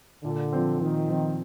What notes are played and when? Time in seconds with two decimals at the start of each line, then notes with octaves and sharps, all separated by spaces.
0.24 A#2 D3
0.53 F3 C4
0.80 A#2 D#3
1.09 F3 C4